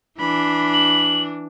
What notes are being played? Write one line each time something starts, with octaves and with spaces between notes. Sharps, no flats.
E3 D4 B5
F#7